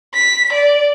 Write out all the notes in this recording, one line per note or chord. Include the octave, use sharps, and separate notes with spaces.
B6
D5